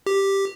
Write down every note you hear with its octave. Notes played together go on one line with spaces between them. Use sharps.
G4